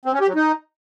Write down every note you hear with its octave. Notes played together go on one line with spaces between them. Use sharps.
C4
C#4
G4
F#3
D#4